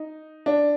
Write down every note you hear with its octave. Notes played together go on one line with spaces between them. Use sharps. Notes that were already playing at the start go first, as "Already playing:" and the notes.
Already playing: D#4
D4